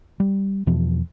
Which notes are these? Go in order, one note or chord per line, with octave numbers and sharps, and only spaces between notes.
G3
E2 B2 E3 F3